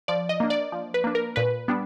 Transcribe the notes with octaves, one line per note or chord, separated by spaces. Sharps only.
F3 D5
D#5
A#3 D4
D5
F3
B4
A#3 D4
A#4
A#2 B4
G3 B3 D4